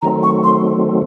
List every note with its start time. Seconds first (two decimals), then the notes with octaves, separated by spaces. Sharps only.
0.02 D#3 F#3 A3 C4 A#5
0.23 C#6
0.43 C6